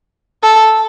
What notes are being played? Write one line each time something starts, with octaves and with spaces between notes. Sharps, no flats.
A4